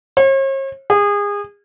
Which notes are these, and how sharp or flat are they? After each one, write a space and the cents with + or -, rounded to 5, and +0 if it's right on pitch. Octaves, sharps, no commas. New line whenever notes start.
C#5 -45
G#4 -30